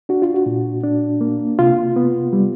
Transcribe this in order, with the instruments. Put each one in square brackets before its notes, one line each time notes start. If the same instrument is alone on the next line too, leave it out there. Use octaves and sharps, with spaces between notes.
[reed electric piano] D4 F#4
F4
F#4
A#2
D4
A#3
C3 F4
B3
G3